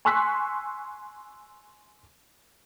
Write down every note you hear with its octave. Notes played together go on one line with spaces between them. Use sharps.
G#5 C6 C#6 E6 F#6 B6